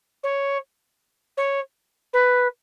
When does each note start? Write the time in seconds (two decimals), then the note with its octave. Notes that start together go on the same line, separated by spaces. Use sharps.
0.24 C#5
1.37 C#5
2.13 B4